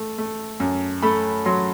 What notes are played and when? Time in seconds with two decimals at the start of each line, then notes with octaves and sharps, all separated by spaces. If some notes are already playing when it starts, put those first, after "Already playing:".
Already playing: A3
0.18 A3
0.60 F#2
1.02 A3 B5
1.45 F#3 C6